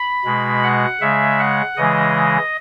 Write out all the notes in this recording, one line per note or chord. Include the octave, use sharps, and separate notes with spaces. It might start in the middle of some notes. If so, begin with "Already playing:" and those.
Already playing: B5
B2 G#3
F#5
C#3 G#3 E5
F#5
C#3 E3 G#3 D#5